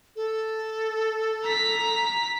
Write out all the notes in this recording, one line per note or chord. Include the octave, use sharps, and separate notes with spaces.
A4
A#5 B6